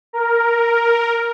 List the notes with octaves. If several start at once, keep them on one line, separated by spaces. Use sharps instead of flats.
A#4